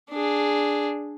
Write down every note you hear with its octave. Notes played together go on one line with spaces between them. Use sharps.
D4 G#4